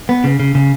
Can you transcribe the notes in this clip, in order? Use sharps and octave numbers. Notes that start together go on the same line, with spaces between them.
B3
C#3
C#3
C#3